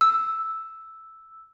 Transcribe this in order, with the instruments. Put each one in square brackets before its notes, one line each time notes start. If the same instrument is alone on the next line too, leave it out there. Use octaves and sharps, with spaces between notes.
[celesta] E6